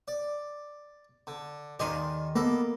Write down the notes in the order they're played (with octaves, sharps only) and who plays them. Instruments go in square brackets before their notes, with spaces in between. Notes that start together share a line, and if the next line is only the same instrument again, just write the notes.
[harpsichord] D5
D3
[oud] D#2 D#3 D#5 [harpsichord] D5 G#5 C6
[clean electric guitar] A#3 [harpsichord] B3 A4 D6